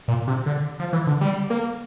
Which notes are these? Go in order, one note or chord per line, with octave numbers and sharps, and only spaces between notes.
A#2
C3
D3
F3
E3
D3
G3
A#3